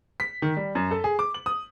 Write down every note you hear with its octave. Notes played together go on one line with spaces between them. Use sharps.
B6
D#3
G3
F#2
A4
G#4
D6
F#7
D#6